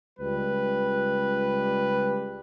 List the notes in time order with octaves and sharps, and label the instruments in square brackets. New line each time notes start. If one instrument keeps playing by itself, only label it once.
[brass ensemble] C#2 G3 B4